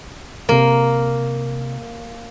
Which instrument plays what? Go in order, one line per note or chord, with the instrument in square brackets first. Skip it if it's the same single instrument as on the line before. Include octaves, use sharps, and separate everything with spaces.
[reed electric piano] C3 A#4 [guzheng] A#3